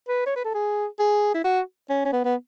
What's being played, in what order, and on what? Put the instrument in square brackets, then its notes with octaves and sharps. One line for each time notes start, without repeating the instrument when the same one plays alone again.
[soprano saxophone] B4
C#5
B4
A4
G#4
G#4
E4
F#4
C#4
C#4
B3
B3